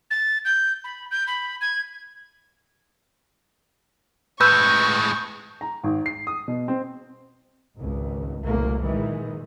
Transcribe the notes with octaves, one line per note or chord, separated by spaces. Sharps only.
A6
G6
B5
G6
B5
G#6
A2 G#3 B4 C#6 E6 G6
A#5
G#1
C7
D#6
B2
C4
G#1 C#2
F#1 C2 A#2 A3 A#3
A#2 D#3 E3 G#3